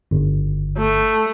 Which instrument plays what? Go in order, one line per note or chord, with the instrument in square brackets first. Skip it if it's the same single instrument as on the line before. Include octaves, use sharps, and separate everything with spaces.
[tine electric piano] G1
[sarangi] A3